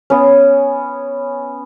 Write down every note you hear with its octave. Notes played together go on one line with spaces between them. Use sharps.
B3 C#4